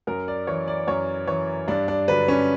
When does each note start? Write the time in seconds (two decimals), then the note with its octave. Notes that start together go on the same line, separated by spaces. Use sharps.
0.07 F#2 A#4
0.28 D5
0.47 E3 C#5
0.68 D5
0.87 F#2 C#5
1.27 E3 C#5
1.68 G2 D4
1.88 D4
2.08 D3 F#3 B4
2.28 C#4